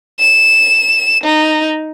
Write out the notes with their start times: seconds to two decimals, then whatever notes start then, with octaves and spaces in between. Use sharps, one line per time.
0.20 E7
1.24 D#4